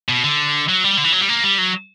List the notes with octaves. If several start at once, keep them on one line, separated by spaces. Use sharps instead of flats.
B2
D3
F#3
G3
D3
E3
F#3
G3
A#3
G3
F#3